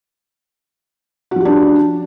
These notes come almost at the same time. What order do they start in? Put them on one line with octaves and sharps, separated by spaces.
F#4 F3 G4 D4 C#4